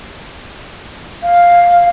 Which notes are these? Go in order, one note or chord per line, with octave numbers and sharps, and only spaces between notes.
F5